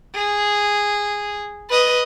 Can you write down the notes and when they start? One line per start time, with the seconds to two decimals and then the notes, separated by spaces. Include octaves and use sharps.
0.15 G#4
1.70 B4 D#5